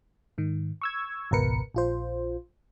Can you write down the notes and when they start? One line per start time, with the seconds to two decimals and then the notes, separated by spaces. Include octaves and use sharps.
0.38 G#2 D#3
0.82 C#6 E6 G#6
1.31 G#1 C#2 B2 A#4 B4 C#7
1.74 A#1 F4 C5